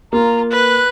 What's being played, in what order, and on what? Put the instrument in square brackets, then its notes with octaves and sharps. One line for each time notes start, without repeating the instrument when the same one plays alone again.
[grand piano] A#3 [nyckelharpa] F4 [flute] A#5
[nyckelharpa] B4 [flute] F#6